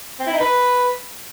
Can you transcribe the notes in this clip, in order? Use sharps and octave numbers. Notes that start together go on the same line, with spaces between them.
C4
E4
D#4
B4